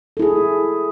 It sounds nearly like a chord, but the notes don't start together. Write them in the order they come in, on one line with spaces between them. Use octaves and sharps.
A4 E4 G#4